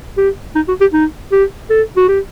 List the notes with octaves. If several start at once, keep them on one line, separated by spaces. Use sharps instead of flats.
G4
D#4
F#4
G4
D#4
G4
A4
F#4
G4